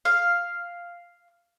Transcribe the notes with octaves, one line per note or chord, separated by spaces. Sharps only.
F5